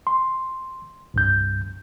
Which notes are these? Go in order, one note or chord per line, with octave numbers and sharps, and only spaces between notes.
C6
C2 G2 G6